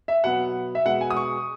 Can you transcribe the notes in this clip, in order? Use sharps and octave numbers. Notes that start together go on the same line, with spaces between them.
E5
B2 F#3 B3 F#5
E5
B2 G#3 B3 F#5
G#5
D#6
C#6